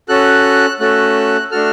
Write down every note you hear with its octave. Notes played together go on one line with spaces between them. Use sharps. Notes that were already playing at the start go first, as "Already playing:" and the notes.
C#4 F#4 A4 F#6
A3 C#4 F#4 A4 F#6
A3 D4 F#4 A4 F6